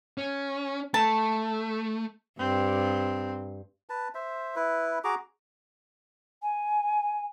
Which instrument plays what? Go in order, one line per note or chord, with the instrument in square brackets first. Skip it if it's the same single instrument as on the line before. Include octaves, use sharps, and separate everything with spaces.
[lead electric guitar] C#4
[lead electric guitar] A3 [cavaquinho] A5
[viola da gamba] G2 [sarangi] C4
[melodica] B4 A5
C5 E5
E4 B4
F#4 G#4 A#5 D6
[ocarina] G#5